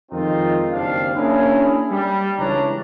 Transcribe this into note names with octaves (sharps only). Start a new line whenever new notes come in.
F2 D#3 G#3 C4 D#4 F4
F#1 D#2 C4 D4 F5
A#3 C#4 D4 E4 G#4 A#4
G3
C#2 E3 C#4 D4 C#5 A#5